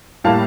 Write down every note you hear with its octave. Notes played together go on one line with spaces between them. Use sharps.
A2 G3 A#3 F5 A5